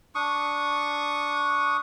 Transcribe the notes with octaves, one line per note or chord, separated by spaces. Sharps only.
D4 C#6 D#6